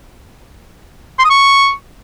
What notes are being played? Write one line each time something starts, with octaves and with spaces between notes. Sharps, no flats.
C6
D#6
C#6